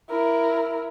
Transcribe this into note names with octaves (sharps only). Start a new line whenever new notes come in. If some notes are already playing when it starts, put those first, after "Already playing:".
E4 A#4